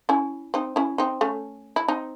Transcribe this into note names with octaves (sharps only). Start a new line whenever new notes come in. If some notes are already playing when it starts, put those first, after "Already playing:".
C#4 E4
C4 D#4
C#4 E4
C4 D#4
A3 C#4
E4
C4 D#4